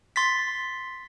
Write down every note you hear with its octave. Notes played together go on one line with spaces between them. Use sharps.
C6 A6 B6